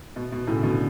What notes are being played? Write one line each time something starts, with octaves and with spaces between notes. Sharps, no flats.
B2
B2
A2 C#3
B2 D3